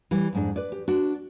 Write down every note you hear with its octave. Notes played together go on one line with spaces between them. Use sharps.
E3 G3
F2 G#2 D4
B4 D5
G4
D4 F#4